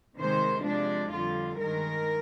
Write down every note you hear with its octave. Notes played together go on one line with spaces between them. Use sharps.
C3 D#3 G#3 C5
C3 F3 G#3 D4
F2 D3 G3 F4
G2 D#3 G#3 A#4